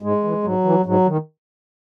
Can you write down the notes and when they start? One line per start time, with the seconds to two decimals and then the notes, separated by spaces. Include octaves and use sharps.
0.02 G#2 G#3
0.24 E3
0.44 G#2 F#3
0.65 E3
0.86 G#2 F#3
1.07 D#3